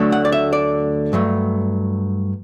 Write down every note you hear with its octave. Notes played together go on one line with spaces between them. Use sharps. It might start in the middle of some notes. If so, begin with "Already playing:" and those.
Already playing: D2 D3 F#3 A3
F#5
D5
E5
D5
G2 F#3 A3